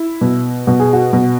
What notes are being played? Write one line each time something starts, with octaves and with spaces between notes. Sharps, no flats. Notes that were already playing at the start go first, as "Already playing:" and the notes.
Already playing: E4
B2
B2 F#4
G#4
F#4
B2